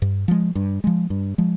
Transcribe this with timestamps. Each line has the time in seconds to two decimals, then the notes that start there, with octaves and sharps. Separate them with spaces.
0.02 G2
0.28 F3 G#3
0.55 G2
0.84 F3 G#3
1.10 G2
1.38 F3 G#3